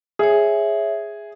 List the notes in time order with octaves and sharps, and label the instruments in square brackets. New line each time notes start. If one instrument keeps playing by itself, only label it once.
[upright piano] G#4 [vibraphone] C#5 E5